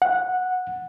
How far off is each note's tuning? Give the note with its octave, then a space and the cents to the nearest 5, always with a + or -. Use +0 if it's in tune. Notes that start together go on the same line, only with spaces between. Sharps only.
F#5 -10